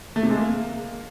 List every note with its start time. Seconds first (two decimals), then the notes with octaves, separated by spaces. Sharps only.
0.16 A3
0.23 C3
0.30 G#3
0.37 A#3